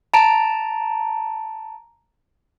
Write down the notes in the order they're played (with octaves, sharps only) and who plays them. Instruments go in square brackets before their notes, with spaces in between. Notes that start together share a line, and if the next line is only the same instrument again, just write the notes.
[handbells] A5 A#5 D7